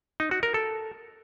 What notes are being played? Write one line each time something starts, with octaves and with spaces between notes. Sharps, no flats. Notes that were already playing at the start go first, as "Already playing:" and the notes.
D#4
F#4
A#4
A4